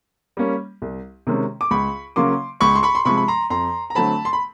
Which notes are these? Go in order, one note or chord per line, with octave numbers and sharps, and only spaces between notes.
G3 A#3 C#4
C2
C3 D#3 G#3 C#4
D6
C#2 B5 C#6
C#3 F#3 A#3 C#4 C6 D6
C#2 B5 C#6
C6
B5 C#6
C6
C3 F3 G#3 B5 C#6
B5
A#5 C6
F2 A#5 C6
A#5
D3 F#3 A3 C4 A5 B5
C6
B5